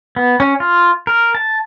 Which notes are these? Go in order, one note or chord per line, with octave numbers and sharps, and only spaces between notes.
B3
C#4
F4
A#4
A5